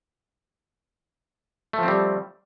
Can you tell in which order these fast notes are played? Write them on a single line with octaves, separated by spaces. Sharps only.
A3 F3 C4 G3